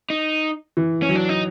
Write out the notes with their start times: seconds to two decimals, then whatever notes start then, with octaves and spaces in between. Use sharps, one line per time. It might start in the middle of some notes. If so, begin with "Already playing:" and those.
0.10 D#4
0.77 E3
1.02 C#4
1.09 F#3
1.15 D4
1.29 D#4